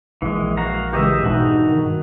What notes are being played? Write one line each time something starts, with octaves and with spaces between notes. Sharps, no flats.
A#1 E3 G#3
F#4 F5 A#5
C#3 E3 G#3 G4 D#5 E5
G#2 B2 D4 D#4 F#4
G2 D#3